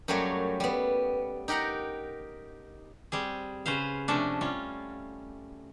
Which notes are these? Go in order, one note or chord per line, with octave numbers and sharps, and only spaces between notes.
F#2 F#3 G3 A3 A#3 C#5
G3 B3
D#4 G4 A#4 F#5 A#5
G3 C4 G#4
C#3 C#4 B4 C5 F5
C3 F3 A3 C#4 D4
G3 C#4 F4